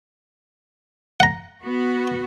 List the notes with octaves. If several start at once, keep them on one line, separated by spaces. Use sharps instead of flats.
F#5 A#5
B3 F#4